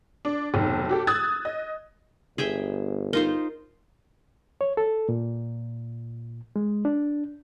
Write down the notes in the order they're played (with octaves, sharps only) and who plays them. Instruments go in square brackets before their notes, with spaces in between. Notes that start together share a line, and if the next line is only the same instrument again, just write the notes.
[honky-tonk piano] D4
F1 B1 D#3
F#4 G4 A4
D#6 E6 F#6 G#6 A6
D#5
[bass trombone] G1 [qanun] G#4 E5 G5
[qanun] D#4 F4 C5 [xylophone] A#4
[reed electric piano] C#5
A4
A#2
G#3
D4